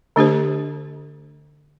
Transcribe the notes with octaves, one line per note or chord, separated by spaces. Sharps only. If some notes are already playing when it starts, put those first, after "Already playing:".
D3 A3 D4 G4 C5